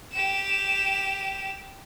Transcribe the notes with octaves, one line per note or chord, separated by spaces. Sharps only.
G4 E7